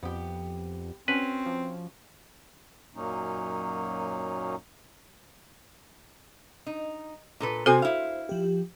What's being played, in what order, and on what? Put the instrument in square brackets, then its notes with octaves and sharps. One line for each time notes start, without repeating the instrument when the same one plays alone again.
[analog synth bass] F2 [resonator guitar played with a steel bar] B3 G4
[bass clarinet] C4 [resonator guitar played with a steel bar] C#4 F#4 [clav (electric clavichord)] B4
[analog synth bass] F3
[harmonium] F#2 A#2 F#3 A#3 C#4 D#4
[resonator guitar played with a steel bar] D#4
A#2 A4 B4
[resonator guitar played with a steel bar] C3 C4 G#5 [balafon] F#4 A4 [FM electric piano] C5
[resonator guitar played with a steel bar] E4 F5
[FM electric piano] F3 G4